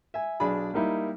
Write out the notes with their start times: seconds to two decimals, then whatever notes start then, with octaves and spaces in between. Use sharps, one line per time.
0.14 E5 G#5
0.40 B1 D4 G#4 D5 B5
0.74 G3 A#3 D#4 E4